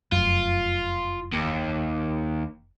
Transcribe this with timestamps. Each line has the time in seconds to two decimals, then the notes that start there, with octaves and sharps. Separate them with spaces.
0.12 F1 F#2 F4
1.32 D#2